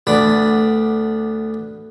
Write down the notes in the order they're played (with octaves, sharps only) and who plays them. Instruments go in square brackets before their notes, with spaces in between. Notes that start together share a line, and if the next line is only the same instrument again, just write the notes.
[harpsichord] D2 B3 D4 D5 B5